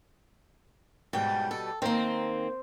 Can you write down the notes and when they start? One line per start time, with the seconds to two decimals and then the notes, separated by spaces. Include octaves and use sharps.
1.13 G#2 B2 G3 G5
1.51 A4
1.82 D#3 A#3 C4